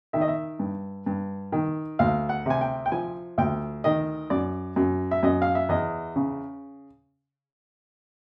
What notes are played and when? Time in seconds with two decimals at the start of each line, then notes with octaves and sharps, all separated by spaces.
0.13 D#3 E5
0.21 D#5
0.28 E5
0.59 G2
1.06 G2
1.52 D#3
1.99 D2 F5
2.29 F#5
2.46 C3 G#5
2.61 G5
2.86 G5
2.92 F3 G#5
3.38 D2 G5
3.84 D#3 D#5
4.30 F#2 D5
4.76 F#2
5.11 E5
5.23 F#2 D#5
5.42 F5
5.55 E5
5.69 E2 D#5
6.16 C#3